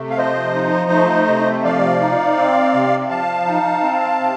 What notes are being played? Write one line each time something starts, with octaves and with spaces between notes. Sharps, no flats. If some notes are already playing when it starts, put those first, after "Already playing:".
Already playing: C3 A3
F5
F3 C5 D#5
D#4
A3
C3
F3 D5 F5
D#4
C4
C3
F3 F5 A5
D#4
C4
C3